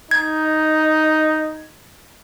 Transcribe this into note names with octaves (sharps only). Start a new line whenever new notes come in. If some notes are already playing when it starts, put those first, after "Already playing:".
D#4 G#6